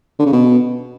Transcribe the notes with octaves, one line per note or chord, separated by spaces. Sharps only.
D3
C#3
B2